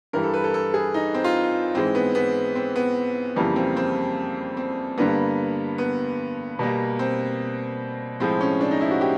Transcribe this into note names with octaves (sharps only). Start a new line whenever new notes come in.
G2 E3 G3 A#4
A4
B4
A4
A4
G#4
D#4
C4
F4
G#2 E3 G#3 C4
B3
B3
C4
B3
F2 C#3 E3 G3 A#3
C4
C4
C4
G2 D3 G3 A#3 B3
B3
B2 G3 A#3
C4
A2 F3 G#3 C4
C#4
D4
D#4
E4
F#4
G4